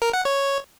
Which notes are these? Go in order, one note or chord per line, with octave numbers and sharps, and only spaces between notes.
A#4
F#5
C#5